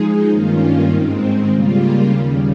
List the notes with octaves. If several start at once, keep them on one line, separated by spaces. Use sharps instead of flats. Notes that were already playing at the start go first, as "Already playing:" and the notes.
Already playing: F3 G#3 D#4 G#4
G2 D#3 A#3 C#4 F4
G#2 D#3 G#3 C4
C#3 G3 A#3 F4
D#2 C#3 G3